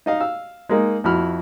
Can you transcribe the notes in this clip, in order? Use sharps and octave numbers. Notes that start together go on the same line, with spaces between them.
D#4 D#5 F5
F5 E6
G#3 A#3 D#4
F2 E4 F#4 B5 F6